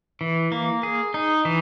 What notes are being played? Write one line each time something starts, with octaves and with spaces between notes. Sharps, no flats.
E3
A#3
G#4
D#4
E3